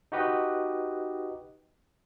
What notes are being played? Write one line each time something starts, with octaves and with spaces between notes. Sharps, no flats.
D#4 F#4 G4 B4 D#5